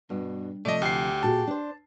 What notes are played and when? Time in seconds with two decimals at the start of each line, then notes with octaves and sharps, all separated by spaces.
0.10 G2 B2
0.65 C3 F3 A3 D5 D#5
0.82 D2 G4 C7
1.23 A#2 F#4 G#4 A5
1.47 D4 C5